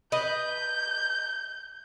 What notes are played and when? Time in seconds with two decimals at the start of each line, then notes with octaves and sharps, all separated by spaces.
0.12 B4 D#5 G6